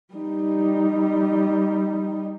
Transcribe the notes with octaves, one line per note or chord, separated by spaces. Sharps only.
G3 D#4